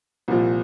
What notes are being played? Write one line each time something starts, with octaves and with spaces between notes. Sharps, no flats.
C2 A#2 F3